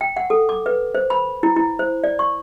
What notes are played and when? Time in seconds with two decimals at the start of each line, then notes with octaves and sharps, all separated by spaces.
0.01 G5
0.17 F#5
0.30 A4
0.49 D6
0.66 B4
0.95 C5
1.10 B5
1.43 E4
1.56 E4
1.79 C5
2.04 D5
2.19 C#6